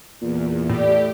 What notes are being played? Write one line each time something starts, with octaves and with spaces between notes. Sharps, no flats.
E2 A#2
A2 D4 G4 G#4